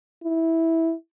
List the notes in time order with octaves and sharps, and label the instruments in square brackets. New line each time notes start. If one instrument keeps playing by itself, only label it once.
[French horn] E4